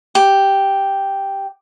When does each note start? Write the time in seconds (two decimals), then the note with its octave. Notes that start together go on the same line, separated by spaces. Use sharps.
0.15 G4